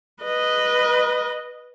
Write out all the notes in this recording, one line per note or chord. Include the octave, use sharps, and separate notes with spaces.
B4 D#5